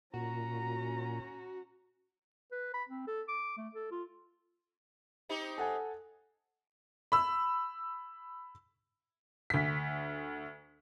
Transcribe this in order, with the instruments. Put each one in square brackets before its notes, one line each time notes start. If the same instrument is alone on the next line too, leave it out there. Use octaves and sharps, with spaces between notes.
[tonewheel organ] A#2 [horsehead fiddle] C#4 A#5 [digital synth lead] F#4
[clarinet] B4
B5
C4
A4
D6
A3
A4
F4
[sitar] C4 D#4 G4
[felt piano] A4 F#5 G#5
[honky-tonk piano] B5 E6
D2 B6